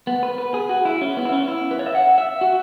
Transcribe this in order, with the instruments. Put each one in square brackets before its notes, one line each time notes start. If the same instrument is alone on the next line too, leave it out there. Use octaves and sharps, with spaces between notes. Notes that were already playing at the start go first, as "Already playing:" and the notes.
[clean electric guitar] B3
B4
B4
G#4
F#4
E4
C#4
B3
E4
C#4
E4
B4
C#5
E5
F#5
E5
F#4